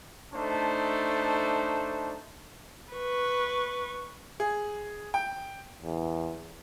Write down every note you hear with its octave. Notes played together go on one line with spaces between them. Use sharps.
A3 D4 D#4 C5 A5
B4 C#6
G#4
G5
E2